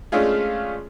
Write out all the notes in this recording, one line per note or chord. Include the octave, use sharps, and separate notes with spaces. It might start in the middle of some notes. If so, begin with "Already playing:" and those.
G#3 A3 C#4 D4 F4 G#4